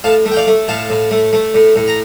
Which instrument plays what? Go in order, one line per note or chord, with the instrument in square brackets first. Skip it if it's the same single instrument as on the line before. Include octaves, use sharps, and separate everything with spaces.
[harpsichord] A2 F5 A5
A3
G5
D5 F5
A3
A2 F5 A5
A2
A3
A3
A2
A2
A#5